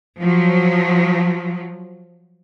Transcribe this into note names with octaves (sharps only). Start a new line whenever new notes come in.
F3 F#3